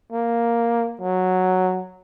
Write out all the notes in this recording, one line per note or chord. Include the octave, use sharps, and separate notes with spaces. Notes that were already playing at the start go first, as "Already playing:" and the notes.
A#3
F#3